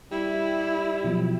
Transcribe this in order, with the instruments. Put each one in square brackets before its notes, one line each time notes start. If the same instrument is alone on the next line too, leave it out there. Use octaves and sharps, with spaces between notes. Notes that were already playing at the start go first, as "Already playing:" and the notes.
[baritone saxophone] G3 [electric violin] E4
[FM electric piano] B2 F3 F#3